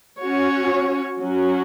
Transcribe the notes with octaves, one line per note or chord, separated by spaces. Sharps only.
C#4 F#4 C#5
F#3 C#4 F#4